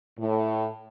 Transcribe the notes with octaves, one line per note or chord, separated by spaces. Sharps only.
A2